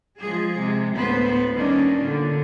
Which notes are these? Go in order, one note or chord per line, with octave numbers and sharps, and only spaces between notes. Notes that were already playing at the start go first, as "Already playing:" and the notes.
F3 G#3 G#4
C3 G#3
D2 A2 B3 B4 C5
D#3 G3 A#3 C#4 D4
A#2 D3